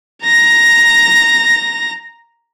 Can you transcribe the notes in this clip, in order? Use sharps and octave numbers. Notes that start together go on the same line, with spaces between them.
A#5 A#6